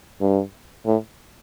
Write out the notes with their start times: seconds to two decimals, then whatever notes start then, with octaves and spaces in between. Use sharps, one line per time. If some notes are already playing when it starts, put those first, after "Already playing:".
0.21 G2
0.86 A2